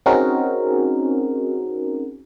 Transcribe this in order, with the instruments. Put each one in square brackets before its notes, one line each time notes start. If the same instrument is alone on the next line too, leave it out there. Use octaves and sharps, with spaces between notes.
[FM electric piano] C4 C#4 D#4 F#4 G#4 A#4